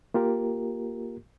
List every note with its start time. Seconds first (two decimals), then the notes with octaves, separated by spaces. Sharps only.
0.14 A#3 F4 G4 A#4